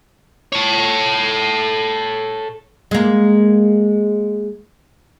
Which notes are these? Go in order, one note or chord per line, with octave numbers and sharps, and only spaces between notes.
A4 C#5
G#3 A#3